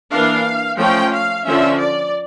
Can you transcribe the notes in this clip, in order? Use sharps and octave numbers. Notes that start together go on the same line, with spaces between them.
E3 A#3 D4 F5
F3 A3 C#4 G5
F5
D3 F3 C#4 E5
D5